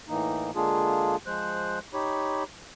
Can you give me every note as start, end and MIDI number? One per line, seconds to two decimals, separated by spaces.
0.09 0.51 45
0.09 0.51 52
0.09 0.51 58
0.09 0.51 63
0.56 1.16 50
0.56 1.16 56
0.56 1.16 58
0.56 1.16 62
0.56 1.16 65
0.56 1.16 68
1.26 1.79 53
1.26 1.79 56
1.26 1.79 72
1.26 1.79 90
1.94 2.44 63
1.94 2.44 67
1.94 2.44 73
1.94 2.44 83